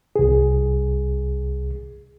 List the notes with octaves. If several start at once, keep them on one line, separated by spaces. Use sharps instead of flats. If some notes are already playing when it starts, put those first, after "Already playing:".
C2 G#4